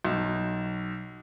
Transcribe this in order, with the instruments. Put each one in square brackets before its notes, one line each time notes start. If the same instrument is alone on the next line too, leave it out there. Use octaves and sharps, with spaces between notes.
[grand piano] B1